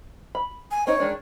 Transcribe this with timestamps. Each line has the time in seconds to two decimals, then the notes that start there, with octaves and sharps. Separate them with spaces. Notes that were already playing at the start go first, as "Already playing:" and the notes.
0.35 B5
0.71 G#5
0.87 C4 D#4 C#5
1.00 D#3 G#3 D4